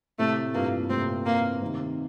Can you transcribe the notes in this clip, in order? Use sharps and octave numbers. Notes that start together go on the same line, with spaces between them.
A2 C3 A3
G2 A#2 A#3
A2 C3 C4
A#3
C3 D#3